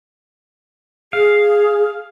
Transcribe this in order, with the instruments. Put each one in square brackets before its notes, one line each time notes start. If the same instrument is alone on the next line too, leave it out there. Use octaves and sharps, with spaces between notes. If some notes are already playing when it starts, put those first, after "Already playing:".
[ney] G#4 [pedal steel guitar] F5